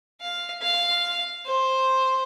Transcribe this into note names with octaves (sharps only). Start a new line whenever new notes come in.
F5
F5
C5